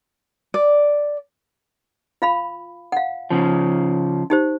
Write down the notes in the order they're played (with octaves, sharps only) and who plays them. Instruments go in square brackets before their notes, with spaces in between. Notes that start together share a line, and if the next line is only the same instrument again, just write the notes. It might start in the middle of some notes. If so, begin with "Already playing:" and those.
[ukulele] D5
[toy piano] F4 F5 B5
F5 F#5
[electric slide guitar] C#3 F3
[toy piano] D#4 G4 C5